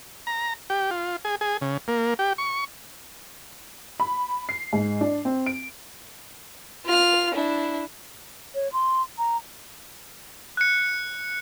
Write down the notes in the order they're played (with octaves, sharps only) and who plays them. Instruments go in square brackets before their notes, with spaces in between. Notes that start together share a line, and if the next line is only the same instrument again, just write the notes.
[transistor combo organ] A#5
G4
F4
G#4
G#4
C#3
A#3
G4
C#6
[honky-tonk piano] B5
C7
G#2
D4
C4
D7
[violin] F4 F6
D4 E4
[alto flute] C#5
C6
A#5
[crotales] F#6 C#7